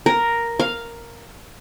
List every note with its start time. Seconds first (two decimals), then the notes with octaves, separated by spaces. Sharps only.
0.06 A#4
0.60 F5